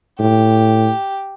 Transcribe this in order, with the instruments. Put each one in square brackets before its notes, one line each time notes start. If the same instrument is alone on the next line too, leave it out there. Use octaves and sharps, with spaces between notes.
[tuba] A2 [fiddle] G4